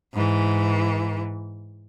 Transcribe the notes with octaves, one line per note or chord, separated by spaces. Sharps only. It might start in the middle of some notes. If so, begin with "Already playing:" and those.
G#2 E3